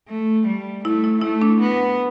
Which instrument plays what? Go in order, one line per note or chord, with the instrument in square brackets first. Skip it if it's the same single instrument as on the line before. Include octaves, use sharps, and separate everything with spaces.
[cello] A3
G3
[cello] A3 [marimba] E4
[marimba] E4
[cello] A3 [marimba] E4
[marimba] D4
[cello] B3